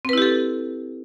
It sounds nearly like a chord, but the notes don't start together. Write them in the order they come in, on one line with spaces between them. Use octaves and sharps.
C4 B4 E4 G4 A4